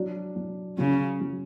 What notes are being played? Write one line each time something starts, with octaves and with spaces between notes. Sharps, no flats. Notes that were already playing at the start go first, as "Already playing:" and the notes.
Already playing: F#3 D4
F#3
C#3 F#3
F#3